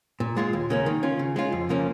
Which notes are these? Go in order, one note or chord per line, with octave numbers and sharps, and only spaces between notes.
A#2
G#3 F4 G#4
D#2
C#3 A#3 C#4
D#3
C#4 F4
C#3
G#3 C#4 F4
F2
C#3 F3 A#3 C#4